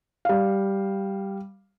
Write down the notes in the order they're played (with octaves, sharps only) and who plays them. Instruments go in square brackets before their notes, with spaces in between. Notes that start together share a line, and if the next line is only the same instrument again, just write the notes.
[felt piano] G3 F5